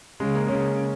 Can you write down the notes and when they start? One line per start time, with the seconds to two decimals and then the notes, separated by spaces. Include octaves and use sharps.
0.20 C#3 G#3
0.35 A#3
0.49 C#3 C#4